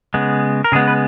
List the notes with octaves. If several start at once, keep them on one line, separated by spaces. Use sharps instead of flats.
C#3 G#3 B3
A#4
C#3 G#3 B3 G#4
B4